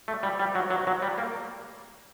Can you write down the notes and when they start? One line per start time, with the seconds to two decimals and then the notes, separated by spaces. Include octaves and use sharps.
0.08 A3
0.23 G3
0.40 G3
0.55 F#3
0.70 F#3
0.87 F#3
1.02 G3
1.18 A#3